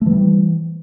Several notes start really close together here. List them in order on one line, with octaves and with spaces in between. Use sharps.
A3 E3 G3